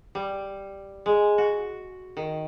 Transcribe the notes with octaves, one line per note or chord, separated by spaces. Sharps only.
G3
G#3
F#4
D#3